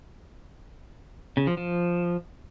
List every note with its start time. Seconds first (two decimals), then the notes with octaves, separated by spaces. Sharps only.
1.37 C#3
1.47 F3
1.57 F3